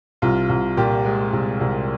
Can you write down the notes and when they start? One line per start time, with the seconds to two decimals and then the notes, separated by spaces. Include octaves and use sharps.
0.22 C2 F4
0.49 C2
0.77 A#2 G4
1.05 G#3
1.33 C2
1.61 C2